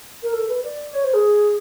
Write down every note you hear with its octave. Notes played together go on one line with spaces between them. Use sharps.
A#4
A4
B4
D5
C#5
C5
G#4